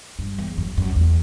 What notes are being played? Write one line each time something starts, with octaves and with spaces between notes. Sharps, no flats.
G2
E2
F#2
F#2
E2